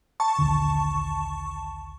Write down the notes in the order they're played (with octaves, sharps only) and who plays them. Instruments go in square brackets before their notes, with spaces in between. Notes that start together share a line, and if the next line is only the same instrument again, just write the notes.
[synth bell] A5 C#6
[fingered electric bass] A#1 D#2 D3